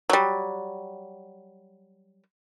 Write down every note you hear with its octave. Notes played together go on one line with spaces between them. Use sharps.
F#3 G3